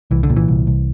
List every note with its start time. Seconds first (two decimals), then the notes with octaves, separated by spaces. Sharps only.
0.11 C2 E3
0.23 D3
0.30 A#2
0.36 E3
0.48 C2
0.67 C2